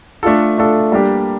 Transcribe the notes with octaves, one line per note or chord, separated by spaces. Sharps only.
A3 D4 F4 A4
A3 D4 F4 A4
G3 A#3 D4 G4